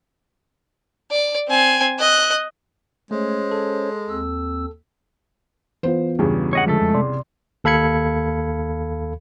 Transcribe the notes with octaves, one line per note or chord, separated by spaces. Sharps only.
D5
C4 G#5
D#5 F#6
G#3 A3 C#4 C5 C#5
A4
D#2 C4 E6
E3 B3 F4 C5
E2 G2 C#3
C#5 D#5 F#5
D3 F3 G#3 A3 A4
F2 F3
C3 D5 C6
D#2 A4 F5 B5 G#6 C#7